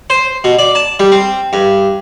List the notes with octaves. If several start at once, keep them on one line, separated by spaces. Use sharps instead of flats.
C5
B2
D5
A5
G3
C4
G2